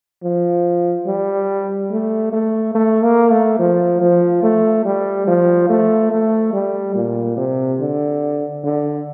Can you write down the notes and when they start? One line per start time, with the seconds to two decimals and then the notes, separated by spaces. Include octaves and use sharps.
0.23 F3
1.06 G3
1.91 A3
2.33 A3
2.75 A3
3.02 A#3
3.31 A3
3.59 F3
4.01 F3
4.43 A3
4.85 G3
5.28 F3
5.70 A3
6.12 A3
6.53 G3
6.95 A#2
7.37 C3
7.80 D3
8.64 D3